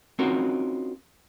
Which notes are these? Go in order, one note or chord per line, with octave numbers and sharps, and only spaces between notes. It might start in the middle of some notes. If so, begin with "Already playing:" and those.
C4 C#4 D#4 F4 F#4 A#4